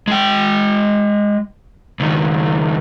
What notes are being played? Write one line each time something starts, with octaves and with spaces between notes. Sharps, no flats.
G#3 G5
C#2 D#3